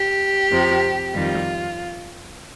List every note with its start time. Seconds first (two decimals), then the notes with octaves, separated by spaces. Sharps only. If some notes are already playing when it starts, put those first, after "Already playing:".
Already playing: G4
0.50 F2 C3 F3
1.14 F2 D#3 G3 F4